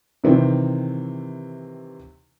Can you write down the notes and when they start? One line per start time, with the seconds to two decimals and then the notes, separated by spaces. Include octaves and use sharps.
0.24 C3 D#3 E3 C4